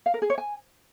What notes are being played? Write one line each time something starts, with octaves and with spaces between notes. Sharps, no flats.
F5
A#4
G#4
C#5
G#5